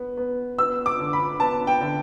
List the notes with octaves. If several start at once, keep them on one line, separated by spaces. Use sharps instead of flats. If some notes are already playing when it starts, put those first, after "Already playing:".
Already playing: B3
B3
B3 E6
D6
D3
B5
B3 A5
G5
D3